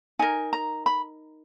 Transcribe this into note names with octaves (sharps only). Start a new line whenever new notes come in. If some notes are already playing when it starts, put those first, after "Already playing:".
D#4 A#4 G#5
A#5
B5